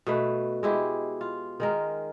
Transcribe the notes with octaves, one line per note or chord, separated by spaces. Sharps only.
B2 A3 B4
G#3 E4 G4
F4
D#3 G#3 A#4